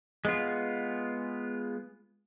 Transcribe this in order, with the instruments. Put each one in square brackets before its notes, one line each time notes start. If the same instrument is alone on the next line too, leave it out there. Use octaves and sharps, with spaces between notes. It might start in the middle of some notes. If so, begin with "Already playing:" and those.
[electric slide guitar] G#3 B3 F4